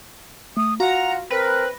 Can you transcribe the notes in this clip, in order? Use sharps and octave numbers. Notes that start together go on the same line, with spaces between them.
A3 D#6
F4 F#4 F#5 A#5
C4 A#4 B4 A#6